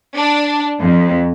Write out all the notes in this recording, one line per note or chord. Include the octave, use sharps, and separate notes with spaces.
D4
F2